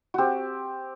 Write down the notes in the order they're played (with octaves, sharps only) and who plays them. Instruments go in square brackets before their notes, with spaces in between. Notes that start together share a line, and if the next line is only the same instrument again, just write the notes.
[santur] C4 F#4 G4